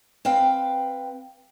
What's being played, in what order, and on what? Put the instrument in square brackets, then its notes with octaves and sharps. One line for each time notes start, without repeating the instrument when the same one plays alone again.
[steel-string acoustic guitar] C4 B4 F5 G5